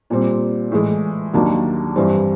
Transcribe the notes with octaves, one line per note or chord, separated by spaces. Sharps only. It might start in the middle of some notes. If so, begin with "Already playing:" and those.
A#2 G3 C4
A2 E3 G#3
D#2 D#3 F#3 A#3 D4
G2 E3 G3 C4